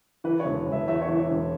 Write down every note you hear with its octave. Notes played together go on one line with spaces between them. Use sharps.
E3 B4
C#5
E1
E1
E5
E2 E5
C#5
E3
E5
E1